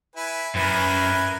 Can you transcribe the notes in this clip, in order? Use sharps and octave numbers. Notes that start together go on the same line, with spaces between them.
E4 B4 G#5
F#2 E4 A#4 B4 G#5